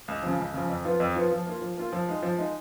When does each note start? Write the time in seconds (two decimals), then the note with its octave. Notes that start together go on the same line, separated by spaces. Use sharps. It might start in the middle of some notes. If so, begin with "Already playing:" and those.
0.08 C#2
0.23 C#3 F3
0.39 C#2
0.54 C#3 F3
0.69 F2
0.85 F3 B3 F4
1.00 F2
1.16 F3 B3 F4
1.32 F3
1.46 A#3 F4
1.62 F3
1.77 A#3 F4
1.93 F3
2.08 G#3 D#4
2.23 F3
2.38 G#3 D#4